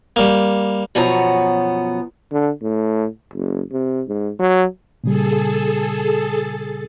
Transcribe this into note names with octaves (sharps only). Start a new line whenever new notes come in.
G3 A#3
F#2 B2 F3 B3 C#5 A#5
D3
A2
F#1
C3
G#2
F#3
A#2 C#3 G3 G#4 A4 A5